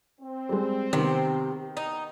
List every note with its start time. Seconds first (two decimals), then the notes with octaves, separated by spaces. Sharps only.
0.21 C4
0.49 G3 G#3
0.93 C3 D#3 B3
1.77 D#4